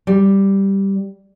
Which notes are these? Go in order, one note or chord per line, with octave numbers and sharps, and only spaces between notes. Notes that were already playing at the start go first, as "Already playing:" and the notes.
G3